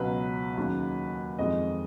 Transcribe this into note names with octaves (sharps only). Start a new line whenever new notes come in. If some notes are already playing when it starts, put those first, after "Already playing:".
Already playing: C#2 B2 F#3 B4
D#2 C#3 F#3
F2 D#3 G#3 D#5